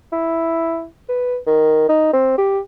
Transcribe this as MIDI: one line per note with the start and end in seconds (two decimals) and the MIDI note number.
0.13 0.86 64
1.09 1.37 71
1.47 1.87 51
1.89 2.12 63
2.14 2.38 60
2.38 2.60 67